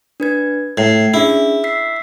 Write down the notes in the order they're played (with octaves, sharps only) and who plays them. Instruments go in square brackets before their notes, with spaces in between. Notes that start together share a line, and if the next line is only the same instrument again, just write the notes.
[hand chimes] D4 B4 G#6
[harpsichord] A2 [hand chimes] G#6 C7
[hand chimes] C#4 D4 G#4 [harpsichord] E4
[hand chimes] E6 B6 C7